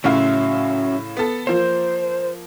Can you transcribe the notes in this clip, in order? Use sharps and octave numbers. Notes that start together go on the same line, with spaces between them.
A2 C#3 F#3 C#4 E5 F5
B3 A4
F3 A#3 C5